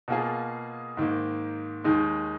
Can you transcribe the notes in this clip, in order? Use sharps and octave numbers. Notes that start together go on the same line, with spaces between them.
B2 A#3 F4 G#4
G#2 D#3 A#3
D#2 D#3 G#3 D#4